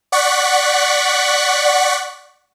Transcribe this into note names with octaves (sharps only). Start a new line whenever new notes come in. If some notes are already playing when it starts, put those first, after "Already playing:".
D5 F#5 C#6 F#6 B6